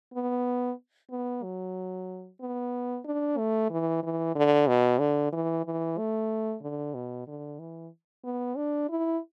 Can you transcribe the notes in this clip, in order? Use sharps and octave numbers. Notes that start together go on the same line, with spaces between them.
B3
B3
F#3
B3
D4
A3
E3
E3
D3
B2
D3
E3
E3
A3
D3
B2
D3
E3
B3
D4
E4